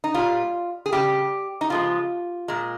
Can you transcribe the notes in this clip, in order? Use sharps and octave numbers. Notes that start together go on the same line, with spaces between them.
D#4
A#2 G3 F4
G#4
C#3 G3 G4
D#4
C#3 F3 G#3 F4
A#2 G#3